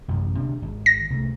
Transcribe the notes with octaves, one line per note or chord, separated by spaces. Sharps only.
A1 F#2 C3
D2 C3 D4
G#1
A#6
C2 D3 A3